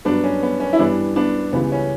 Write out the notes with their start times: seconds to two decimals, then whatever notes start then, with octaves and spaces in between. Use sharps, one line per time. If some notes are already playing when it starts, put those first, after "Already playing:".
0.05 G2 F#3 B3 D4
0.24 C#4
0.43 B3
0.60 C#4
0.73 E4
0.79 G2 E3 G3 B3 D4
1.16 B3 D4
1.52 C#2 C#3 E3 G3 B3
1.72 C#4